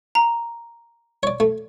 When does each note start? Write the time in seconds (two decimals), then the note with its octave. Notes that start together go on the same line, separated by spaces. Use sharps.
0.15 A#5
1.23 C#5 D5
1.40 A3